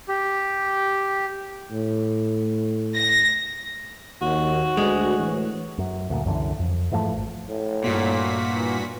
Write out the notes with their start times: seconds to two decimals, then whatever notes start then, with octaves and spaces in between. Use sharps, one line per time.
0.08 G4
1.71 A2
2.96 A#6
4.22 D#2 F#4
4.77 D2 G#3
5.19 A2 E3
5.78 F#2
6.10 D2 A#2
6.25 C2 F#2 D3 E3
6.60 F2
6.91 G#2 E3 F3 A3
7.12 G#1
7.48 A2
7.84 G2 A#2 F#4 B6
8.53 E3